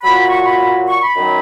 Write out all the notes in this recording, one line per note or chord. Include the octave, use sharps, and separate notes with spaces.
A#2 F#3 B5
B5
C#6
B5
C#6
B5
F#2 D#3 F#3